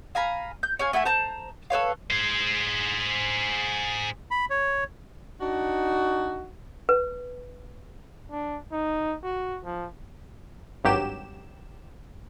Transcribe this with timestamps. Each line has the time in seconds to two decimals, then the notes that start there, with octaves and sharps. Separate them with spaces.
0.15 F5 G#5 A#5 B5
0.63 G6
0.79 C#4 F5 G#5
0.93 A3 E4 F#5 G#5
1.05 C5 A5 A#5 G6
1.70 A4 B4 C#5 F5
2.10 G#4 C5
4.31 B5
4.50 C#5
5.41 D4 D#4 F#4
6.89 B4
8.31 D4
8.72 D#4
9.23 F#4
9.65 F3
10.84 G#1 G2 F#3 G4 E7